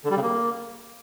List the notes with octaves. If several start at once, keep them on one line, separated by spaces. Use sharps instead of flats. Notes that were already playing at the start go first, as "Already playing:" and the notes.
D3
G3
C#3
A#3